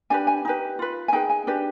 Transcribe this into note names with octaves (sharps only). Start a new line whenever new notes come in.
D4 G4 B4 G#5
G#5
D#4 G4 B4
F4 B4
G#5
D#4 G#4 B4 G5
G#5
D4 G4 B4